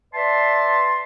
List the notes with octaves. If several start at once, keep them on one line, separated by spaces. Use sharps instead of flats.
B4 D5 E5 A5 C6